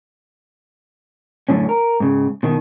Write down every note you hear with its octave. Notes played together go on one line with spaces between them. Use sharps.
F#2 A2 D3 C#4
A#4
G#2 C#3
B2 D#3